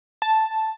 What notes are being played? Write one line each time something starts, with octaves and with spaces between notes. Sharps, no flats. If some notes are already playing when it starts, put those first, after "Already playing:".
A5